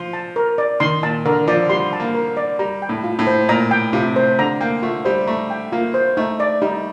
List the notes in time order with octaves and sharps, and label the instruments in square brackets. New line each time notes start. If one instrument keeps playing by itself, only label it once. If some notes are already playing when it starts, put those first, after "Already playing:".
Already playing: [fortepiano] F3 [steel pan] C6
[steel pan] A5
A#4
D5
[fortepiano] D#3 [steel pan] C6
[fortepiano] A#2 [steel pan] A5
[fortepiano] D3 [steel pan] A#4
[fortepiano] F3 [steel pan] D5
[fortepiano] G3 [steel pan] C6
[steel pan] A5
[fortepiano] A#3
[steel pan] A#4
D5
[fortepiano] G3 [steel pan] A#5
[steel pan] G5
[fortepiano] A2
[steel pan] F4
[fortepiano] A2
[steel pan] C5
[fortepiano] A#2 [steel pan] A#5
[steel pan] G5
[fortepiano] C3 [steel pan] F4
[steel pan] C5
[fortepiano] D3 [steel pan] A#5
[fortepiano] A#3 [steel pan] G5
[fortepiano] A3 [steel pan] F4
[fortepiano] G3 [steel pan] C5
[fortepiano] A3 [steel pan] A#5
[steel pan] G5
[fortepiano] A#3 [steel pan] F4
[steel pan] C5
[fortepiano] A3 [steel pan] D#4
[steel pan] D5
[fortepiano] G3 [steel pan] D#4